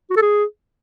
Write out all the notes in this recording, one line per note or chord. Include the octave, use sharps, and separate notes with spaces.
F#4
A4
G#4